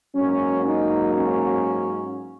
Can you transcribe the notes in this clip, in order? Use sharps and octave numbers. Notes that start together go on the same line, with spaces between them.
G#2 F#3 A#3 C#4
D#4
C#4